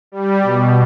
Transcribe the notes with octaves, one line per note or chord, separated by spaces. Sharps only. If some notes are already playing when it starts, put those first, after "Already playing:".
G3
B2